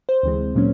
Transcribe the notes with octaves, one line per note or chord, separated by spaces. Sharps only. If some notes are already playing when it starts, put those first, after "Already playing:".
C5
D2 C3 E3 G#3 C4
A#2 F#3 A#3 C#4